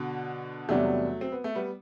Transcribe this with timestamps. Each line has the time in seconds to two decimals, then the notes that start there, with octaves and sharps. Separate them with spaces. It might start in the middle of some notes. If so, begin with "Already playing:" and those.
Already playing: B2 D3
0.69 E2 C3 F#3 G3 A3 B3 D4
1.21 C4
1.32 B3
1.44 A3
1.55 G3 B3